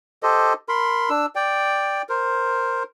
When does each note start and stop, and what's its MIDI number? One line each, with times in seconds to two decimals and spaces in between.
0.23 0.53 67
0.23 0.53 69
0.23 0.53 72
0.23 0.53 75
0.69 1.09 70
0.69 1.09 83
0.69 1.09 84
1.10 1.26 62
1.10 1.26 88
1.35 2.02 74
1.35 2.02 79
2.09 2.83 70
2.09 2.83 72